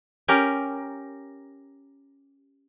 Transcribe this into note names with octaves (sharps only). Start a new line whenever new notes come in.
C#4 G4 A#4